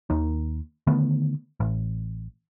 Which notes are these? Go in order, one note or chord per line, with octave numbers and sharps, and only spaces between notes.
D#2 D#3
D3 D#3 A3 B3
A1